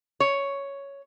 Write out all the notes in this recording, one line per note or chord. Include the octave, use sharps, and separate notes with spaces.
C#5